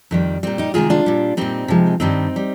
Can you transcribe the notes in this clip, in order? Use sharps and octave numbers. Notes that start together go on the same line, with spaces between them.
F2 D#3 G3
A#2 G3 C4
D#4 G4
C3 D#3 G#3 F4 G#4
D4 F4
A#2 G3
A#2 G3 C4 D#4
C3 F3 G#3
G2 D#3 G3 C4 D#4
G3